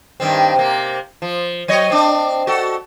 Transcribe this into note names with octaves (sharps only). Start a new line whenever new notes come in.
G2 D#3 C4
C3 A#3
F3
F#3 C#5 D#5
C4 D4
F#4 A4